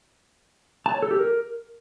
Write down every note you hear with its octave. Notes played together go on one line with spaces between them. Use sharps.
A5
C#5
A4
G4
A#4